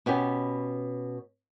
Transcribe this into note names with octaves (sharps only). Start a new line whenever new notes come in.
B2 B3 C#4 G4